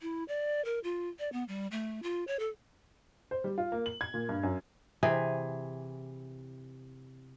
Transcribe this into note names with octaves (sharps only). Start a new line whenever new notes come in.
E4
D5
A#4
F4
D5
B3
G3
A3
F4
C#5
A4
C5
G3
F4
A#3
F#7
G#6
A#2
G2
F#2
C3 E3 G#4